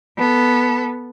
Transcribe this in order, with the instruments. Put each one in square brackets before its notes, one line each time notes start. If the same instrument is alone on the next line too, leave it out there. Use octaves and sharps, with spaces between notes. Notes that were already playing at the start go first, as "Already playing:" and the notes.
[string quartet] B3 A4